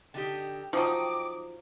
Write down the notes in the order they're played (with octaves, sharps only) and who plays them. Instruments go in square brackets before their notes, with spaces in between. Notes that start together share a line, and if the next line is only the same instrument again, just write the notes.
[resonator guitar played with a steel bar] D3 D#4 G4 [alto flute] G5
[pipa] F3 F#3 [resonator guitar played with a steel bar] D#4 D#5 [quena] D6